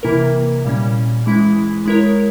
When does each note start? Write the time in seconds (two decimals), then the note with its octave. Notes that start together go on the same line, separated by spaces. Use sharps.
0.03 C3 E3 A#3 E4 A#4
0.65 A#2 G3 C#4
1.26 E3 G#3 E4
1.86 G#3 E4 A#4 C#5